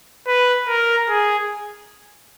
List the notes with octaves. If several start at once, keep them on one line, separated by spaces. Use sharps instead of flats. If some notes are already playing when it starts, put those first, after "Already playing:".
B4
A#4
G#4